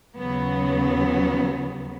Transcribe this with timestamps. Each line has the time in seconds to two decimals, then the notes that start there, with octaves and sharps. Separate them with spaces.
0.17 D#2 C#3 F#3 B3